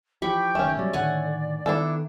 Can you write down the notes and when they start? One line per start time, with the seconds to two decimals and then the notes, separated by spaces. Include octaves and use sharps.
0.22 E3 F3 G4 G5 B5 C#6
0.55 F#1 D#3 A3 C#4
0.77 B2 F#3 G3 D5
0.93 A2 D3 D#3 F#5 G#5
1.66 D#3 B3 D4 E4 A4